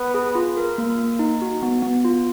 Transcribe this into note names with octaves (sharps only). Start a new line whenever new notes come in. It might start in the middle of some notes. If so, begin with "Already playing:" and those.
Already playing: B3
G#4
F4
A#4
A#3
A#3
D#4
F#4
B3
B3
F4